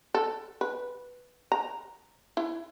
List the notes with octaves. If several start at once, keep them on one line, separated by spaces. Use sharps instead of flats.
A4
B4
A#5
E4